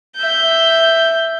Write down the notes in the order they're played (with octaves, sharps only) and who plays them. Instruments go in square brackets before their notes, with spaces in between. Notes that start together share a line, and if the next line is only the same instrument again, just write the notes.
[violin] E5 G6